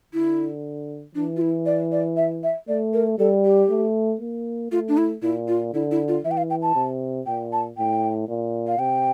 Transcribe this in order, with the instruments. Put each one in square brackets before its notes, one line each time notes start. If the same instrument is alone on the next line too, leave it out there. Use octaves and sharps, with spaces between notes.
[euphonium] D3 [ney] E4
[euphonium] E3 [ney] D4
[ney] F4
E4
D5
D5
E5
E5
[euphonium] A3 [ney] D5
[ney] A#4
[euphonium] G3 [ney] A4
[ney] G4
[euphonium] A3
A#3
[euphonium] A3 [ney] F4
[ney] D4
E4
[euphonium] A#2 [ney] E4
[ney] F4
[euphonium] D3 [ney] E4
[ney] E4
F4
[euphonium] E3 [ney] E5
[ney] G5
F5
G5
A5
[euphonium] C3
[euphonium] A#2 [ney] G5
[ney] A5
[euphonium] A2 [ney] G5
[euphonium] A#2
[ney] F5
[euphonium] C3 [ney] G5